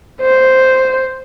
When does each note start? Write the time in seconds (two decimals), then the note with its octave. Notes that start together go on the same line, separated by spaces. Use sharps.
0.22 C5